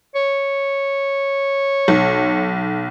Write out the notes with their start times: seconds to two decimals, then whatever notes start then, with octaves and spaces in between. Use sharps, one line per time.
0.15 C#5
1.88 B1